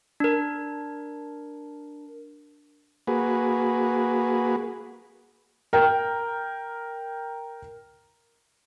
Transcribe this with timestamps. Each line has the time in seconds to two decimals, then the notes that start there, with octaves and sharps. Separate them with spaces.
0.20 D4 A#4
3.07 A#3 F#4 G#4 B4
5.73 A#4 G5